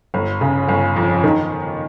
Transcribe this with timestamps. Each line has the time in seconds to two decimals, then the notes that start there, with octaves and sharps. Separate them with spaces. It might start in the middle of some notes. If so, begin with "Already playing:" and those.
0.14 G1
0.41 C#3
0.69 G1
0.96 F2
1.24 D#3